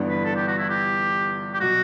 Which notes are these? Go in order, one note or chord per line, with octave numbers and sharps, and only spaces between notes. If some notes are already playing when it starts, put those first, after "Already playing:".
Already playing: G1 G2 E3 B3 D4
B4
A4
G4
F#4
E4
G4
G4
B2 F#3 F#4